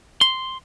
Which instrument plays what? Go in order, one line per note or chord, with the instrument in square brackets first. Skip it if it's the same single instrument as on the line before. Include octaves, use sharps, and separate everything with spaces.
[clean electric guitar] C6